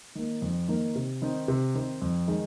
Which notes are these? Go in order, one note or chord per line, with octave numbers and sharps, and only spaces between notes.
D#3 A#3
F2
D#3 A#3
C3
D#3 C4 D#4
C3
D#3 C4 D#4
F2
D#3 G#3